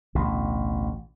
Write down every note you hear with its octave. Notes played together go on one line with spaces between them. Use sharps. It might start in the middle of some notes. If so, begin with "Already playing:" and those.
A1 D2 B2